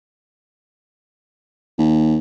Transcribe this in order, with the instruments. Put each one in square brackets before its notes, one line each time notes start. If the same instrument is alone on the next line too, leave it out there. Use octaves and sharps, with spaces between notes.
[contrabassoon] D#2